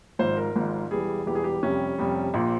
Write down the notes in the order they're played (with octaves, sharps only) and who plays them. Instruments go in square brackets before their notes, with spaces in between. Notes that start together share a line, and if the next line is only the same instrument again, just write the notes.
[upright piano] G#1 G#2 F3 C5
A#4
G#1 G#2 F3
E1 E2 E3 G3 G#4
E1 E2 E3 G3 G4
G#4
G4
F1 F2 C3 G3 C#4
F1 F2 C3 G3
A#1 A#2 F3